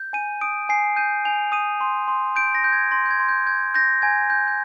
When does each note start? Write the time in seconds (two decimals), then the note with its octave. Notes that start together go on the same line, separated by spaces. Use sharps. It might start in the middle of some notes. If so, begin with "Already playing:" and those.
Already playing: G6
0.13 G#5 D#7
0.41 D#6 D7
0.69 G#5 C7
0.96 G6 D#7
1.25 G#5 F7
1.52 D#6 D#7
1.81 C6
2.08 C6
2.36 G6 D7
2.55 A#6
2.64 G6
2.72 G#6
2.91 C6 A#6
3.06 G6
3.11 G#6
3.20 C6
3.29 G6
3.46 G6 G#6
3.74 G6 A#6
4.02 G#5 G#6
4.30 G6
4.48 G6